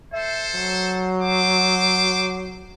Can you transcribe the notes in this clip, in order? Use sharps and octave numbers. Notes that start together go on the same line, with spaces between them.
A4 C5 E5
F#3
C5 D6